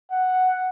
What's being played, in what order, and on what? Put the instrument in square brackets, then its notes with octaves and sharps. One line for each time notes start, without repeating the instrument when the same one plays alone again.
[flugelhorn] F#5